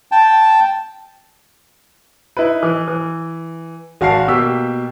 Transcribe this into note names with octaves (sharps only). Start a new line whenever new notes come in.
G5 A5
D#4 E4 B4
E3
E3
G#1 F#4 F5 A5 C7
B2 A#3 G4 E6 B6